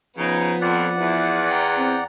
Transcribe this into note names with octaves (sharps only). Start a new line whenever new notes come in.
C#3 F3 B3 D#4 B4
F2 D5 F#5
E2 E4
G5 A#5
C4